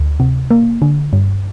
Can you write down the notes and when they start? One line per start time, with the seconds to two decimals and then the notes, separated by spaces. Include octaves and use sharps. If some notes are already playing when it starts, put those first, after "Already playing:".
Already playing: D2
0.20 C3
0.51 A#3
0.82 D3
1.13 G2